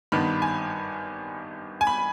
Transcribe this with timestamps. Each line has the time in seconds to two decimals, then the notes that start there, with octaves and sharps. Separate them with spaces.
0.12 G#1 G2 D#3 B3 B5
0.42 G#5
1.81 G#5
1.87 B5